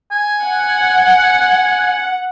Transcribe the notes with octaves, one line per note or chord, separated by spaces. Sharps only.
G#5
F#5